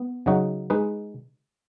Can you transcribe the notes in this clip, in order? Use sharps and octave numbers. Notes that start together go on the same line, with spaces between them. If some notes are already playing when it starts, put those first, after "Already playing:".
Already playing: B3
C#3 F#3 D#4 F#4
G#3 D#4 B4